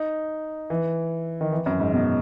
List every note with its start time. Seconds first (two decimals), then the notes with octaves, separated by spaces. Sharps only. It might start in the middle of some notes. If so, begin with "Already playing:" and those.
Already playing: D#4
0.70 E3
1.41 D#3
1.52 E3
1.66 F#2
1.80 G#2
1.93 B2